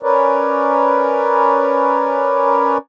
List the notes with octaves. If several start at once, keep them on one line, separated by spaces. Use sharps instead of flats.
C#4 A#4 B4 C#5 D5